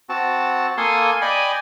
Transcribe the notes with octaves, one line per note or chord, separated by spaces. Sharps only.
C4 F#4 A5
A#3 A4 F5 G#5 C6 D#6
D5 D#5 G5 G#5 B5